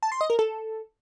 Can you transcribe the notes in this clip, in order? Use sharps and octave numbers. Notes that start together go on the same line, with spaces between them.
A5
C6
D#5
A#4
A4